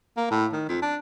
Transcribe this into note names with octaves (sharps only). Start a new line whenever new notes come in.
A#3
A2
D#3
F2
D4